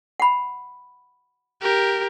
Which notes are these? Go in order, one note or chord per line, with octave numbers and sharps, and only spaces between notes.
F#5 B5
G4 A#4